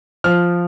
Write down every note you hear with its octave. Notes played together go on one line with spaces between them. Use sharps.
F3 F6